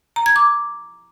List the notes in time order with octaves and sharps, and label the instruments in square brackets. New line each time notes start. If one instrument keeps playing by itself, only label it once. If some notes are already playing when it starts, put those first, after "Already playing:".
[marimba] A#5
G#6
D6